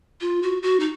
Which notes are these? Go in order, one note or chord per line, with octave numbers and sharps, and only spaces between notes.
F4
F#4
F#4
D#4